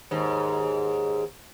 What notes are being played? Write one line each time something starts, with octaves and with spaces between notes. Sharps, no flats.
D#2 G#2